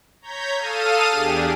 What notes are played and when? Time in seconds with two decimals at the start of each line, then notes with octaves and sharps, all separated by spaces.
0.21 C#5 A#5 G6 G#6 B6
0.57 A4 F5 A5 D#6 F6 D#7
1.08 E2 D4 G4 G#4